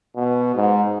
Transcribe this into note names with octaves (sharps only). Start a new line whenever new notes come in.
B2
G#2